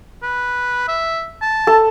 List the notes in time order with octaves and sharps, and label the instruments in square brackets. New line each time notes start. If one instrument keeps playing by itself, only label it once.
[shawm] B4
E5
A5
[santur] A4